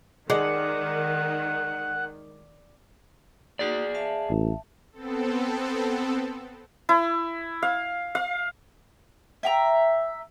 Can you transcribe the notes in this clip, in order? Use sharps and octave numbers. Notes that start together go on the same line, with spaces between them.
D#3 G#3 D5 F#5
A#3 D#4 F#4 G#4 D5
E5 F5 A5
A1
B3 C4 A4
E4
F5
F5
E5 G5 A#5